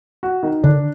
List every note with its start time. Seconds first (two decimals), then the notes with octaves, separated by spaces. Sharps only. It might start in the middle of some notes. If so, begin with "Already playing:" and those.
0.23 F#4
0.43 D#3
0.63 D3 D4